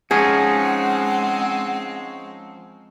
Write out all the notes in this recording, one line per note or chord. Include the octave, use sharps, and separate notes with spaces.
F3 G#3 C4 C#4 D#4 G#4 F#5